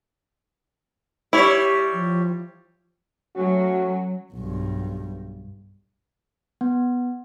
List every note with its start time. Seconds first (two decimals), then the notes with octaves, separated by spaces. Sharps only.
1.33 G3 E4 G4 C#5
1.93 F3
3.36 F#3 A3 C#4 F#4
4.34 B1 G2
6.61 B3